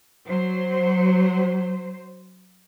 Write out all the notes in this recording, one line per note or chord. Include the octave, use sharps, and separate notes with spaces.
F#3 C5